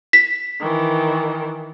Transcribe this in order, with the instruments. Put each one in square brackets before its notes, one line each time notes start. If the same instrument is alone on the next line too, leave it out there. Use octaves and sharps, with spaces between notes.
[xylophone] B6
[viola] D#3 E3